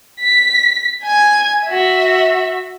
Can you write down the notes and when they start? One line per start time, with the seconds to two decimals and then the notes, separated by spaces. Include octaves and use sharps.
0.19 B6
1.03 G#5 G#6
1.65 F#4 E5